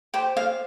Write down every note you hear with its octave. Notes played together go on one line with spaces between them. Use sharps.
G4 C5 G5
F5